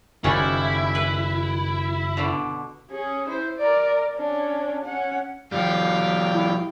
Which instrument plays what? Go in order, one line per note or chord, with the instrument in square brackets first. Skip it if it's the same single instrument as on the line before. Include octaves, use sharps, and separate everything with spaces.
[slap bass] F#1 D#3 [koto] G3 G#3 C#4 [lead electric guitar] E4
[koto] B4
B2 D3
[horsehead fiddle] C#4 G#4
E4 C5
A#4 D5
C#4 D4
C#4 F#5
[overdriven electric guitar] F3 G3 [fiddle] F5 G5
[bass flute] E4